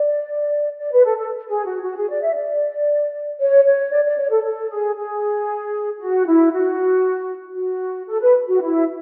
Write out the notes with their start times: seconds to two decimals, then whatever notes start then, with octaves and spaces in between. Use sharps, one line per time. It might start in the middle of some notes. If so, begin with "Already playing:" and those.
Already playing: D5
0.78 D5
0.92 B4
1.05 A4
1.17 A4
1.48 G#4
1.66 F#4
1.83 F#4
1.96 G#4
2.09 D5
2.22 E5
2.35 D5
3.40 C#5
3.65 C#5
3.91 D5
4.04 D5
4.17 C#5
4.31 A4
4.44 A4
4.70 G#4
4.96 G#4
6.00 F#4
6.26 E4
6.52 F#4
7.56 F#4
8.08 A4
8.21 B4
8.48 F#4
8.61 E4